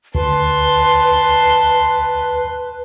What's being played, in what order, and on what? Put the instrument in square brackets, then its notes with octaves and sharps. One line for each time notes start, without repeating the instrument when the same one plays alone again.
[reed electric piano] D2 [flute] B4 [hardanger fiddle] A5 C6